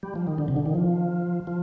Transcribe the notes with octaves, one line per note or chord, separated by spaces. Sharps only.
G3
F3
D#3
D3
C3
D3
D#3
F3
F3